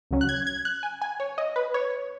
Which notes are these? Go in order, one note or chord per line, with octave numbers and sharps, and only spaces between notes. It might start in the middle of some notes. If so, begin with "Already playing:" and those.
C#2 C#3 F#3 C#4
F#6
G#6
G#6
F#6
G#5
G#5
C#5
D#5
B4
C#5